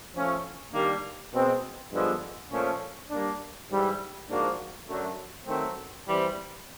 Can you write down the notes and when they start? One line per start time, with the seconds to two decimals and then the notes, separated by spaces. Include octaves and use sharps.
0.13 F3 A3 C#4 F4
0.72 D#3 G3 A#3 D4 G4
1.32 B2 G#3 C4
1.91 G2 D3 F3 G#3 B3
2.50 A#2 F3 A3 C#4
3.10 G3 A#3 D4
3.69 G#2 E3 G3
4.28 G#2 F3 A#3 D4 F#4
4.87 F#2 D3 F#3 A3
5.46 D#3 F#3 A3 C4
6.06 E3 G3 C4